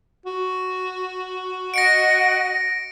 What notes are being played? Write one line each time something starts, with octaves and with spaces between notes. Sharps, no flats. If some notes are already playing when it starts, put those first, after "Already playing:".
F#4
D#5 F#5 A#6 C#7 D7